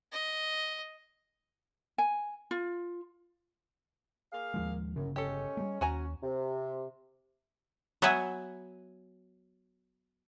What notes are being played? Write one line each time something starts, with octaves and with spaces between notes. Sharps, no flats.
D#5
G#5
F4
A#3 G#4 F5
D#2 F3 G#3
G1 F#2 C#3
G#3 C#4 G4 A4
G3 A3
D#2 C#4 F#4 G#5 A#5
C3
F#3 B3 E5 F#5 G#5